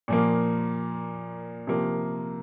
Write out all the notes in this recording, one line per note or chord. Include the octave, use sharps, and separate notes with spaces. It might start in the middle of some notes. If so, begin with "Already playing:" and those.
A#2 F3 A#3
C3 F3 A#3